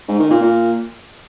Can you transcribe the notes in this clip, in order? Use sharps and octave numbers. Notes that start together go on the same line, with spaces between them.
G#2
D#3
A#2
A#2